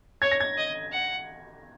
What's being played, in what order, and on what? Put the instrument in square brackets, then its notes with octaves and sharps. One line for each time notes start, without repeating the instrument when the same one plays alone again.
[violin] C#5 [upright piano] G#6
[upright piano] A#6
G#6
[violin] D#5
F#5